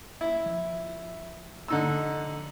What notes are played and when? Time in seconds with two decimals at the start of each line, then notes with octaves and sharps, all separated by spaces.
0.21 E4
0.46 F3
1.68 D3 D#4 E6